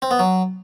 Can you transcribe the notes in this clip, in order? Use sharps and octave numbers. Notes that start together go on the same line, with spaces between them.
C4
B3
F#3